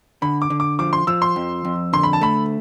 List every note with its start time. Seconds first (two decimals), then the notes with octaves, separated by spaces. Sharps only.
0.22 D3 B5
0.42 D6
0.50 D3
0.60 D6
0.79 F3 D6
0.93 C6
1.07 F3 E6
1.22 C6
1.36 F2
1.65 F2
1.93 D3 C6
2.03 B5
2.13 A5
2.21 A3 B5